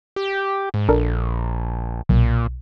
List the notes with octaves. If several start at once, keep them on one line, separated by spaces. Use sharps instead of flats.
G4
G#2
A#1 D4 A4 A#4
B1 A#2